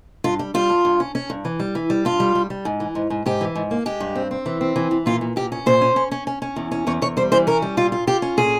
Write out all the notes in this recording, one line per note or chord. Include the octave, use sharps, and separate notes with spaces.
G2 F4
G3
G3 F4
G2
G2
C#4
C#4
G2
E3
G3
E3
G3
G2 F4
G3
G3
G3
G#2
E3
G#2
G#2
G#2 G4
E3
G#2
A#3
G#3 G4
G2
C4
C4
E3
C4
E3
E3
A#2 F4
A#2
A#2 G4
C#4
A#2 C5
C#4
C#4
C#4
C#4
C#4
E2
C#4
E2 C#5
E2 C#5
G3 C5
E3 C5
C#4 A#4
G3
A#2 F4
F4
F4 G4
C#4
A#2 G#4